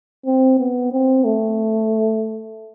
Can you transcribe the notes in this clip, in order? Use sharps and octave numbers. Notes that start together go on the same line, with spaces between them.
C4
B3
C4
A3